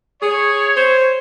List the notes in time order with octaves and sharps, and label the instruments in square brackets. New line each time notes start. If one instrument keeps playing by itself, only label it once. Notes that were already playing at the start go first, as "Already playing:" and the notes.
[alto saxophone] G#4 [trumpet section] C#5
[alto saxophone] C5